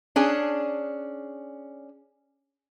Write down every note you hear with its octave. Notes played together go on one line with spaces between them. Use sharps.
C#4 D4 G#4